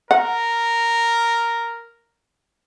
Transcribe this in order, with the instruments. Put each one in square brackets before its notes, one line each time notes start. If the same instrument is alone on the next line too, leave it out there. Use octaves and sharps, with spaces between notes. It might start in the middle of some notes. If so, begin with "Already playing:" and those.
[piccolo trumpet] A#4 [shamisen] F#5